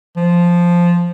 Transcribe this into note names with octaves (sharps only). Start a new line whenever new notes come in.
F3